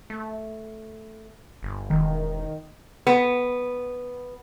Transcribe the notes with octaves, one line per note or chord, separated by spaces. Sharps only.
A3
G1
E1 D#3
B3